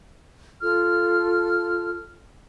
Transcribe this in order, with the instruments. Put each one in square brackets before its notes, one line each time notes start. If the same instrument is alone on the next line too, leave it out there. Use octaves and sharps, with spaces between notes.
[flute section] F4 A4 F6